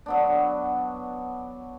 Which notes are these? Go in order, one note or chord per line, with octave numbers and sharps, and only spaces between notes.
F#3 B3 D4